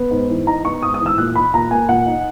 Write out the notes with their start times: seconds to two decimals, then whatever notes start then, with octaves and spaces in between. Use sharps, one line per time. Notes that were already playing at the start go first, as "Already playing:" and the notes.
Already playing: B3
0.11 G#2
0.29 E3
0.47 D#4 A#5
0.65 B3 C#6
0.82 G#2 D#6
0.94 D#6
1.00 E3
1.06 E6
1.18 A#2 F#6
1.35 D#4 B5
1.54 A#2 A#5
1.71 A#3 G#5
1.89 A#2 F#5
2.07 D#4